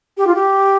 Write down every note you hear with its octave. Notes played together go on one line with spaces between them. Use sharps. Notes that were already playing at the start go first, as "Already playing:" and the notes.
G4
F4
G4